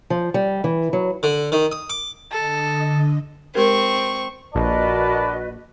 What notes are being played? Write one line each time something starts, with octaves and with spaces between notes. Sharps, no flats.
F3
G3
E3
F#3
D3
D#3
D#6
D6
D3 A4 D#5
G#3 C4 G4 A#4 C#6
A#1 F#4 A#4 B4 D5 D#5 A5